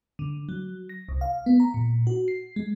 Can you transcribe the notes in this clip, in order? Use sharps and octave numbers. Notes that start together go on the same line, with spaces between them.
D3
F#3
A#6
C2
F5
B3
A#5
A#2
F#4
C7
G#3